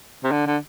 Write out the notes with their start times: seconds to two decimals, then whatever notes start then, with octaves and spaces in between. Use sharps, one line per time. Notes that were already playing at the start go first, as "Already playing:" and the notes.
0.24 C3
0.31 D3
0.46 D3